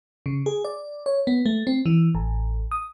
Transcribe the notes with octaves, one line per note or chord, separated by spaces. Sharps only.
C#3
G#4
D5
C#5
B3
A3
C4
E3
A1
D#6